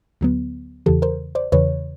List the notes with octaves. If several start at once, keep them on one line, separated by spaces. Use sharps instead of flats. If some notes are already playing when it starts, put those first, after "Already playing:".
D2 D3 F#3 B3
E2 C#3 E3 G4 A4
A#4 C5
C5 D5
E2 C#3 E3 B4 C#5